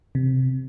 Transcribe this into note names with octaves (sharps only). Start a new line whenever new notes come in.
C3